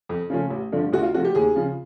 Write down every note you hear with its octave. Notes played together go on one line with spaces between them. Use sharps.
F2
C#3 F3 A3 C#4
A1
G2 D3 F3 A3
D2 F#4
F4
C3 F3 A3 F#4
G4
D#2 G#4
C#3 F3